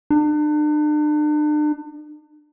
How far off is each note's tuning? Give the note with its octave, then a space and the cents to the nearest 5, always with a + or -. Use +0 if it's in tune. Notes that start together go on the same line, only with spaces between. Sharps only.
D4 +40